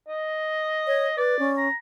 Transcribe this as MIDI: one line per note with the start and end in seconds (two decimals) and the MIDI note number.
0.08 1.12 75
0.87 1.07 73
1.17 1.38 71
1.17 1.50 74
1.39 1.68 61
1.57 1.74 82